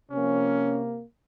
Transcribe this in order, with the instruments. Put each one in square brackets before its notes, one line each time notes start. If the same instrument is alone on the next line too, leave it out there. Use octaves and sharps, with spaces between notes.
[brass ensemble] C3 F3 A#3 C#4